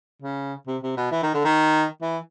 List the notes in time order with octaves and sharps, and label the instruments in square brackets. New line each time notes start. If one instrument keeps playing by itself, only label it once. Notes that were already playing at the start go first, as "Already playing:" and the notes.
[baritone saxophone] C#3
C3
C3
B2
E3
D#3
D3
D#3
E3